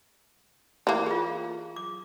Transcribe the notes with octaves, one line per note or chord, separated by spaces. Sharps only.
E3 A#3
F4 G#4
D6